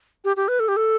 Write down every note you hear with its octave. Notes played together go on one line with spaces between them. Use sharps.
G4
G4
B4
A4
G4
A4